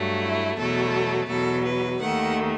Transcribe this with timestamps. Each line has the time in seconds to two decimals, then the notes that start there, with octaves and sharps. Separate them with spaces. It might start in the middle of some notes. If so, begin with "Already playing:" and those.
Already playing: G2 F#3 A3
0.22 E4
0.58 E2 B2 F#3 A3 A4
1.29 E2 B2 F#3 A4
1.64 B4
2.00 D#2 D#3 A3 F#5